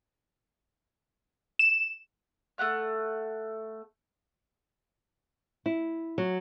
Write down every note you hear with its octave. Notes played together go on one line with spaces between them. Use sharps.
E7
A3 B3 F#5 F6
E4
F#3